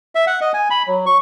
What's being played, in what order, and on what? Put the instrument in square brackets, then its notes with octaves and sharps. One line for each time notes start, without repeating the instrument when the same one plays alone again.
[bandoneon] E5
F#5
D#5
G#5
B5
F#3
C#6